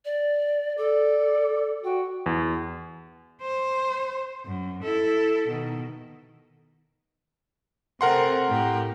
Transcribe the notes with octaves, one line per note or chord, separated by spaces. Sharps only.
D5
A4 D5
F#4 G5
E2
C5
F#2
E4 A4
B2 D#3
C3 A3 C4 A#4 F#5 C6
A2 G4